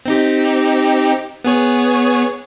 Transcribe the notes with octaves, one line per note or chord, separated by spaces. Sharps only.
C4 D#4 G4
B3 G#4 C#5